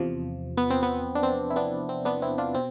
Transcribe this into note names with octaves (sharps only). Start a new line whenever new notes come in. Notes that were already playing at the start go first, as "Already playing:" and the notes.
Already playing: E2 C3 F3
B3
C4
B3
D4
C4
E4
B3 D4
C4
B3 D4
C4 E4
D4 F4
B2 C4